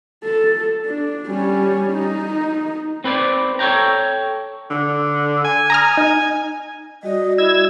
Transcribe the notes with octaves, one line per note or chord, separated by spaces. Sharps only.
A4
D4
G3 C#4
D#4
C4 B4 C5 D5
A4 C#5 D5 G5 A#5
D3
G#5
A#5 D#6 F6
D#4
G3 F#4 D5 D#5
E4 E6 G#6